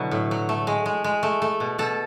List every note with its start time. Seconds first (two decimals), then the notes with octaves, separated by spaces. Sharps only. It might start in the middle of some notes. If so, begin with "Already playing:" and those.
Already playing: B2 D3 F#3 E4
0.11 A2
0.31 F#3
0.49 A3
0.67 G#3
0.86 G#3
1.04 G#3
1.23 A3
1.42 A3
1.60 B2
1.78 B2 A4